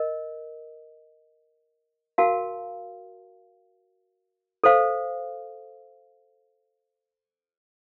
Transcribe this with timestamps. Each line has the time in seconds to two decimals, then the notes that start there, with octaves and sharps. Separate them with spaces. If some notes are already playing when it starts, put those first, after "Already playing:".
Already playing: A#4 D#5
2.18 F#4 A#4 F5 A5
4.64 A4 C5 F5